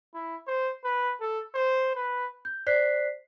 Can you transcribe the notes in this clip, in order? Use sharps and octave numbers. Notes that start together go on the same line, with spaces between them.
E4
C5
B4
A4
C5
B4
G6
C5 D5 F#6 B6 C7